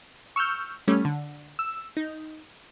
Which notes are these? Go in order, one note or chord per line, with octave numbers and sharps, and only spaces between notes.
C#6 E6 F6 G6
G3 A3 C#4
D3
E6
D#4